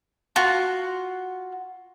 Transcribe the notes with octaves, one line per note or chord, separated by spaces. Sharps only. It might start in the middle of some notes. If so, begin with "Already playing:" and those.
F4 F#4 F#5